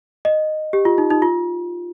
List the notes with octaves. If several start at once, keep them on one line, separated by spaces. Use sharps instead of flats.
D#5
G4
F4
D#4
D#4
F4